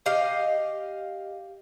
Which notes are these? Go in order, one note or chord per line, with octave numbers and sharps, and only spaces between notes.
G4 D#5 F5